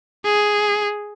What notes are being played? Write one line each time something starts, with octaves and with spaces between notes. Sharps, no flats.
G#4